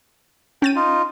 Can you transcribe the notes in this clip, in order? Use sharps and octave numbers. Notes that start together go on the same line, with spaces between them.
C#4 G5 A6 D#7
D#4 F4